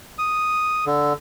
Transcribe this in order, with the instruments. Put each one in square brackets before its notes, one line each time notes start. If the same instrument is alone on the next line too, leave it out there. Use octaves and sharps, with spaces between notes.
[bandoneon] D#6
D3